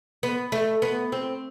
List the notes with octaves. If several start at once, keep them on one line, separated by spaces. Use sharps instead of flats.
B3
A3
B3
C4